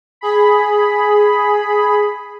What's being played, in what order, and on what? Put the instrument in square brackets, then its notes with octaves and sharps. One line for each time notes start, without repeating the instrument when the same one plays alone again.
[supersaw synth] G#4 B5